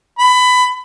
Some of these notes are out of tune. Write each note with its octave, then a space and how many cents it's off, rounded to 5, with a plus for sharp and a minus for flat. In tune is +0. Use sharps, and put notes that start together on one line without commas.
B5 +20